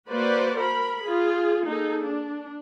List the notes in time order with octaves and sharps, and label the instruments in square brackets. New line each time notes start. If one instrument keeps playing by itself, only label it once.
[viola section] A#3 F#4 B4 C5 D5
A#4 B5
F4 G#4
A#3 D#4 G#4 A4
D4